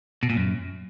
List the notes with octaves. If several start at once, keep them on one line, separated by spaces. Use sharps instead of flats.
B2
A#2
F#2